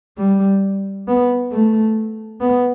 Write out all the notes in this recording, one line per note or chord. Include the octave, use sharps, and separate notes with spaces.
G3
B3
A3
B3